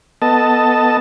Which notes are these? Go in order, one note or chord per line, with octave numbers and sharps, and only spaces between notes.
B3 A4 D#5 A5